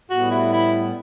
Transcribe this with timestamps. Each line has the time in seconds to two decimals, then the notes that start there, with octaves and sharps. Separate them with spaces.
0.10 A2 G3 B3 F#4
0.31 E4
0.53 E4